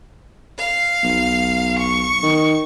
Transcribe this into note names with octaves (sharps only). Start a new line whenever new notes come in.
F5
B1
C#6
D#3